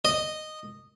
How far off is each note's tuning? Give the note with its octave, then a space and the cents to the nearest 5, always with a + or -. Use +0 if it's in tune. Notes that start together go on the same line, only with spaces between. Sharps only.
D#5 -10